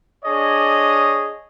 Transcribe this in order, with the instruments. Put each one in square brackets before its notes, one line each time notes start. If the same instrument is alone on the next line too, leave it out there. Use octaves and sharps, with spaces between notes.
[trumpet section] D4 G#4 C#5 D#5